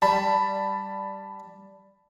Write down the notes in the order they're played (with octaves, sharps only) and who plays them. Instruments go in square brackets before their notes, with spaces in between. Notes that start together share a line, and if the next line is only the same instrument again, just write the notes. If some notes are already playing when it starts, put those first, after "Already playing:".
[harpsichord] G3 [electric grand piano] A5 B5